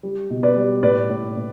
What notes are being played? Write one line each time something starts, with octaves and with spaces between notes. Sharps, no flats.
G3
B2
B4 D5
G3
A2 B4 D5
A2
A2